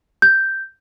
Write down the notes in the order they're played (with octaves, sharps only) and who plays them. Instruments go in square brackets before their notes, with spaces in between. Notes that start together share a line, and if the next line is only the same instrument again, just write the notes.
[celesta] G6